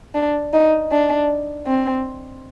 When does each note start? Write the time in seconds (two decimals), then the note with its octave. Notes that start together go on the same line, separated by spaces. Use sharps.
0.15 D4
0.53 D#4
0.91 D4
1.67 C4